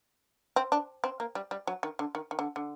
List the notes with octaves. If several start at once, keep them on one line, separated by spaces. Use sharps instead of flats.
C4
D4
C4
A#3
G3
G3
F#3
D#3
D3
D#3
D#3
D3
D3